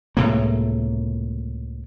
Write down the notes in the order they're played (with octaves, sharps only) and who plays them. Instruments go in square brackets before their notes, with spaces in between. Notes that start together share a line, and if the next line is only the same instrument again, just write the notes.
[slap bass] C#2 A2 C3 A#3